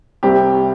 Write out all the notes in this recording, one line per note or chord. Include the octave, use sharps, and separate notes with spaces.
C2 C3 G3 C4 G4